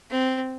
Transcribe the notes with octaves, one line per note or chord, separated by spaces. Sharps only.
C4